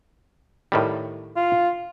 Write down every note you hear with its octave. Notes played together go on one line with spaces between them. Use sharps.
A2 D#3 G3
F4